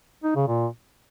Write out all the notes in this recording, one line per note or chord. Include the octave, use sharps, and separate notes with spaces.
D#4
C#3
A#2